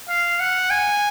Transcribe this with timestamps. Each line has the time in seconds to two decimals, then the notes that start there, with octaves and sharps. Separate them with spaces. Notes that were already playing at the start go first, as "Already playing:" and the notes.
0.08 F5
0.40 F#5
0.70 G#5